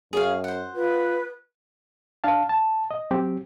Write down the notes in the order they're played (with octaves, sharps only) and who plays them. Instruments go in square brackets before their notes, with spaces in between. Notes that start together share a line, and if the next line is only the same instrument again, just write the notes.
[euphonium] F#2 [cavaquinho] G#4 C#5 F5
[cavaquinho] C5 F#5
[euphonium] F4 [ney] B4
[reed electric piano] D4 F5 A5
A5
D#5
F#3 C4 G4